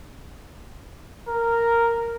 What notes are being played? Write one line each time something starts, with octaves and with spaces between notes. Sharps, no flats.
A#4